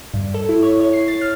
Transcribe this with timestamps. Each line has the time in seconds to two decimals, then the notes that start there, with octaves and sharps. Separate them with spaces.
0.14 G2
0.34 A4
0.49 E4
0.63 C#5
0.80 C#5
0.93 C7
1.08 A6
1.21 F6